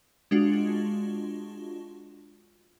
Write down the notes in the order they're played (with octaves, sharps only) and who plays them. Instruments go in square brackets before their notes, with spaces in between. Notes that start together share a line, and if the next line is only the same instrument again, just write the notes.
[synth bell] G#3 D4 F4 F#4